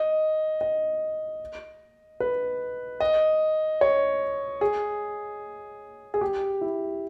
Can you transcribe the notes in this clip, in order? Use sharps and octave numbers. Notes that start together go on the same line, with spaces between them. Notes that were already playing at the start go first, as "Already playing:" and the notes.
Already playing: D#5
D#5
B4
D#5
C#5
G#4
G#4
G4
E4